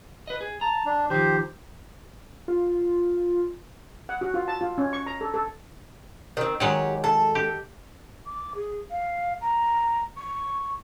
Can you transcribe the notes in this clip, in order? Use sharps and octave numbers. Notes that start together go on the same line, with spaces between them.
B4 D#5
G#4
A5 A#5
D4
D#3 F3 G4 C5
F4
F#5
F#4
F4
A5
F4
C#4
C#6
A#5
A4
A4
D#3 C4
D#3 F#3 G#3 G4 C#5
A4
G4
D6
G#4
F5
A#5
C#6